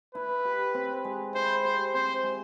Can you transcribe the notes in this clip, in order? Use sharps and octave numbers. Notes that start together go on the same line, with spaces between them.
E4 B4
G4
C4
G#3
E4 C5
G4 C5
C4 C5
G#3